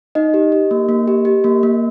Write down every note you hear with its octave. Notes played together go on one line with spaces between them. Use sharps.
D#4 D#5
G4
G4
A#3
A#3
G4
G4
A#3
A#3